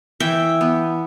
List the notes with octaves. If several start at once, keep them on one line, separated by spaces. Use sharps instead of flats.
E3 E5 G5
B3